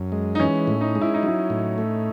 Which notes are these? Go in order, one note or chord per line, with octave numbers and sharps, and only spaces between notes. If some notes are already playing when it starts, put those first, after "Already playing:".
Already playing: F#2
G#3
D#4
E3 C#4
A2
D#4
G#3
E4
D#4
F#3 E4
A2
A3